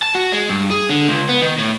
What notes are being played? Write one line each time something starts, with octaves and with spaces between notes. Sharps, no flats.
A5
F#4
G#3
G2
G#4
D3
C#2
B3
D#3
A2